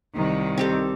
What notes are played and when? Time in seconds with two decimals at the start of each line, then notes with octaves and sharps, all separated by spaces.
0.14 C2 D#3
0.58 C4 G4 A4